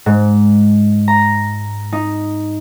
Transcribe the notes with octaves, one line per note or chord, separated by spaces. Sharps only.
G#2
A#5
D#4